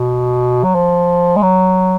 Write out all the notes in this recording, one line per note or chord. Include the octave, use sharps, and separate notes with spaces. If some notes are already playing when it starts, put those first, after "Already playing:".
Already playing: B2
F#3
F3
G#3
F#3